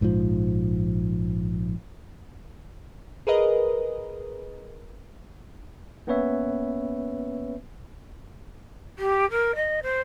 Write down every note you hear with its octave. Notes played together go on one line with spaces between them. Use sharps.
A#1 G#2 C3 F3
G#4 A#4 B4 D#5
A#3 B3 C#4 B4 C#5 E5
G4
A#4
D#5
C5